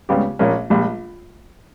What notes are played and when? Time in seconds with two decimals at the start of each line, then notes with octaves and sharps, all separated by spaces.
0.09 C#2 C#3 G3 B3 G4
0.39 A#1 A#2 A#3 C#4
0.70 A#1 A#2 G3